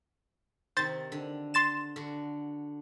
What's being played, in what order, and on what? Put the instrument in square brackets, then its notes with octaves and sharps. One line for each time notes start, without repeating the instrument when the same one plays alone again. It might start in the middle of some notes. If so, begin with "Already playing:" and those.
[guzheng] C3 D#3 [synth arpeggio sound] C5 A6
[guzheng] D3
[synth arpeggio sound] C6 A6 E7
[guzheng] D3 F#4